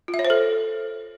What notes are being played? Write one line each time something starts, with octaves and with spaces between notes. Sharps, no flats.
F4
E5
C#5
C5
A4